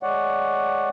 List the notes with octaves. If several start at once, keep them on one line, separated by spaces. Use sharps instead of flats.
G#3 C#5 D5 F#5